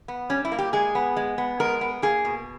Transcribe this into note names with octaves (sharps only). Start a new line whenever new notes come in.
B3
G3 C#4
E4
A#3
G4
G#3 G#4
B3
G#3
B3
G#3 A#4
B3
A#3 G#4
B2